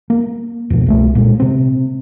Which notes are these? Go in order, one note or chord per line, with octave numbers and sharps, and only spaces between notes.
A#3
F2 B2
C2 G#3 A3
A#2 G#3
C3 C4